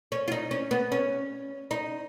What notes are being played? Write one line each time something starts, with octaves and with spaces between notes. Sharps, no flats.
C#4
F4
D#4
C#4
B3
C#4
D#4